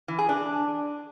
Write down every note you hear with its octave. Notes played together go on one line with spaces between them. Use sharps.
E3
G#4
D4